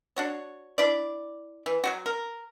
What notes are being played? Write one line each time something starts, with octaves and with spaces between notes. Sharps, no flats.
D4 F#4 C#5
D4 E4 D5
E3
F#3 G3 F#4
A#4